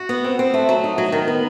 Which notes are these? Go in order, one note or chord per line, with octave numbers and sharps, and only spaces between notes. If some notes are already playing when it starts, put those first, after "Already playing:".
Already playing: F#4
B3
C4
C4
A3
F#3
D#4
F#3
D#3
B3